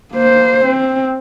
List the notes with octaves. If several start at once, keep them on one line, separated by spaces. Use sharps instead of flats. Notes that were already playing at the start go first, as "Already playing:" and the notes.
A#3 C5
C4